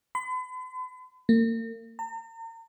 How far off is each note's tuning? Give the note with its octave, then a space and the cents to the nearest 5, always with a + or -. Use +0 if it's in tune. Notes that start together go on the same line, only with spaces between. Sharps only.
B5 +45
A#3 -40
A#5 -45